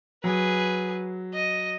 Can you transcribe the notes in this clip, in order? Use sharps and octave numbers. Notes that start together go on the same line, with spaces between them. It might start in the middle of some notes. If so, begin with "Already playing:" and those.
F#3 G#4 B4
D#5